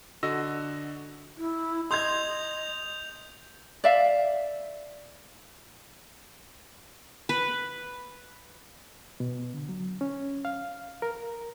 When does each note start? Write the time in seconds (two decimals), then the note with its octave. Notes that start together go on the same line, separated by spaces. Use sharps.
0.23 D3 F#4 D#5 E6 A#6
1.38 E4
1.91 D#5 C6 D#6 G6 G#6 F7
3.84 D5 E5 F5
7.29 B4
9.20 B2
9.54 D3
9.69 F#3
10.01 C#4
10.45 F5
11.02 A#4